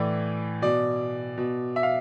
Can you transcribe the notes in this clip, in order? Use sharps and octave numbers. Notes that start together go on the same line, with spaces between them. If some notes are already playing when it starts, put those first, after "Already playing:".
Already playing: A2 E3 D5
B2 D5
B2
E5
F5